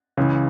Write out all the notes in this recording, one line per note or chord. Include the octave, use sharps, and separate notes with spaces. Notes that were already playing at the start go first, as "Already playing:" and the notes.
C#2 C#3 E3